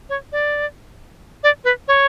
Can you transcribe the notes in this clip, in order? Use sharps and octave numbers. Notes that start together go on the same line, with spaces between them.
C#5
D5
D5
B4
C#5